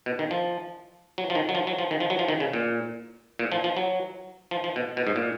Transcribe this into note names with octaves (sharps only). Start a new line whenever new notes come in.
B2
D#3
F3
F#3
F3
D#3
F#3
F3
F#3
F3
D#3
F3
F#3
F3
D#3
C#3
A#2
A#2
F3
F3
F#3
F3
F3
B2
B2
G#2
A#2